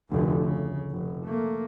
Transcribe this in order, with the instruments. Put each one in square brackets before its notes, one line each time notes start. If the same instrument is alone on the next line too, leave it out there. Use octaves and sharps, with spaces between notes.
[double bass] F1 D2
C#3
F1
A3 A#3